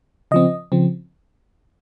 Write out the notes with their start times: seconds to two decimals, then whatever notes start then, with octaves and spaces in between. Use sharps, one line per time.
0.31 C#3 F3 C4 D#5
0.72 C#3 F3 C4